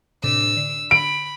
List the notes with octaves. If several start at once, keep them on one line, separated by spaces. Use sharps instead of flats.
A2 C3 D4 E6
D3
B5 D7